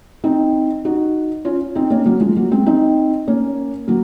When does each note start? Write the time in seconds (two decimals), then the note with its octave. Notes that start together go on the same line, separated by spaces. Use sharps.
0.24 C4 D#4
0.85 D#4 F#4
1.45 C#4 F4
1.75 C4 D#4
1.90 A#3 C#4
2.05 F#3 A#3
2.21 F3 G#3
2.36 F#3 A#3
2.51 G#3 C4
2.66 C4 D#4
3.28 A#3 C#4
3.88 F#3 A#3